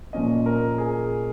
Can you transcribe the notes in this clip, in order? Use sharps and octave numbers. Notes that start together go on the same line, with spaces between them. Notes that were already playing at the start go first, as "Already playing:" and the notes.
A#2 F3 A#3 C#4 D#5
A#4
G#4